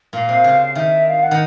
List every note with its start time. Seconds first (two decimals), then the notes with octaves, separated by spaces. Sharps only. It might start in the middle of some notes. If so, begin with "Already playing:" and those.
0.13 A#2 F5
0.29 C3
0.44 C#3
0.75 D#3 E5
1.08 F5
1.23 F#5
1.31 D#3